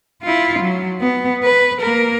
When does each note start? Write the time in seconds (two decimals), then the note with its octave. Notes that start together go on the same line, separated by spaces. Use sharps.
0.22 E4 F4
0.59 F#3
1.01 B3
1.43 B4
1.81 A#3 A#4